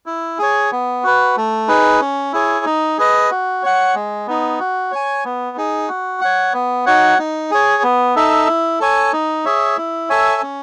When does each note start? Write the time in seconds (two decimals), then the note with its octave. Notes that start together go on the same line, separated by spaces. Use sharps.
0.06 E4
0.39 G#4 C#5
0.71 B3
1.04 F#4 B4
1.37 A3
1.68 D#4 G#4 B4
2.00 C#4
2.33 E4 G#4 C#5
2.65 D#4
2.98 G#4 B4 D#5
3.31 F#4
3.63 C#5 F#5
3.95 G#3
4.27 B3 D#4
4.59 F#4
4.92 C#5 G#5
5.25 B3
5.57 D#4 G#4
5.88 F#4
6.21 C#5 F#5
6.53 B3
6.86 D#4 F#4 C#5 F#5
7.18 D#4
7.51 G#4 C#5
7.83 B3
8.16 D#4 A4 E5
8.47 E4
8.80 A4 C#5 G#5
9.13 D#4
9.45 G#4 C#5 E5
9.77 E4
10.10 A4 C#5 E5 G#5
10.42 C#4